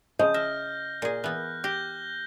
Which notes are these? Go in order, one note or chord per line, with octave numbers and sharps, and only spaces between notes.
C#3 F3 D#5 G6
E5 F6 A#6 G7
A#2 G#4
E3 B3 F#6
G4 G6 A#6 G7